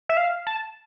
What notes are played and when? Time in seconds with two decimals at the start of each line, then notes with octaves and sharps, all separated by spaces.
0.09 E5
0.17 F5
0.47 A5